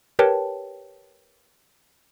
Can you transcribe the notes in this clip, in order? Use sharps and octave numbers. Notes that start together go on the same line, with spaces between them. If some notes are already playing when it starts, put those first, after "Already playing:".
G4 A#4 B4 C#5 G5 A5